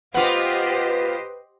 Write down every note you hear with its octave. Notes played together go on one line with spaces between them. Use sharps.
B3 F4 G4 B4 C5 D#5 F#5